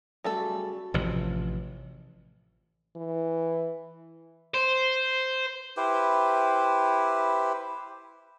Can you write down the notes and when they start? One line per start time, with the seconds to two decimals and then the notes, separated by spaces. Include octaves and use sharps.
0.24 C#3 F#3 G3 A3 A4
0.94 A1 C3 F3
2.96 E3
4.54 C5
5.77 E4 G4 B4 C5